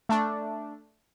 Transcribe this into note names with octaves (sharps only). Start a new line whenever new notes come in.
A3 D4